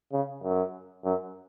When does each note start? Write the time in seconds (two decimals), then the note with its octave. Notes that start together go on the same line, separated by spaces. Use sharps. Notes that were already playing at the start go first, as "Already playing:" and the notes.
0.12 C#3
0.43 F#2
1.05 F#2